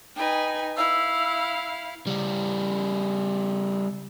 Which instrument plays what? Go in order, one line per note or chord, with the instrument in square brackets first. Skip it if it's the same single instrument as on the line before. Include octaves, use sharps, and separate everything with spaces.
[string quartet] D#4 B4 G#5 [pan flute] G5
[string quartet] E4 F5 [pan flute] E6
[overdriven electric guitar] C#3 G3